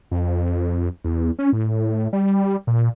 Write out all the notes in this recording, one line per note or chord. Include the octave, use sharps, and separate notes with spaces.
F2
E2
C#4
A2
G3
A#2